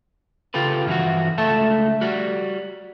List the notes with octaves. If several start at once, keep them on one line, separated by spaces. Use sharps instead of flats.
C#3 F4 G4 A4 B4
G2 E3 F3 F#4
C#2 A3 A4 E5 A5
G3 F#4